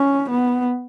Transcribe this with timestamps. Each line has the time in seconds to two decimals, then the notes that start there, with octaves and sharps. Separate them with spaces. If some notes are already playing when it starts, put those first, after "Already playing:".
Already playing: C#4
0.31 B3